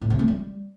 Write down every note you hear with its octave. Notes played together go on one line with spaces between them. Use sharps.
A2
C3
A3
G3